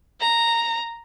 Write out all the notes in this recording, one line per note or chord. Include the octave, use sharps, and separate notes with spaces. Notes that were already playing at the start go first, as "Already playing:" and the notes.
A#5